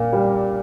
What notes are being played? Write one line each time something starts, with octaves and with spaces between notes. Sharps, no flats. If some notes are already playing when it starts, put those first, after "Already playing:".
Already playing: A#2 A#3
G3